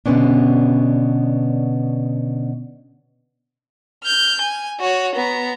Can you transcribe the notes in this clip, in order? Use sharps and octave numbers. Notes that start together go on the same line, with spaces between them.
B2 D3 B3 C#4 D4
F6 G6
G#5
F#4 C#5
B3 A#5